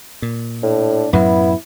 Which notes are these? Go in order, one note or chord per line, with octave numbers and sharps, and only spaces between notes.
A#2
A2 D4
F#2 A2 F#3 B3 E4